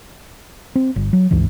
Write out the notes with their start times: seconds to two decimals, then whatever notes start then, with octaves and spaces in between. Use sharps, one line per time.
0.75 C4
0.96 G1
1.13 F#3
1.31 G#1 C#2 G2 E3